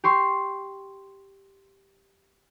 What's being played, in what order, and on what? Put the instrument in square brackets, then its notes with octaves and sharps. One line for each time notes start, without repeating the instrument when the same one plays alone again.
[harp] G4 C6 C#6